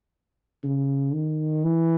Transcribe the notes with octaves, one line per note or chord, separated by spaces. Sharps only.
C#3
D#3
E3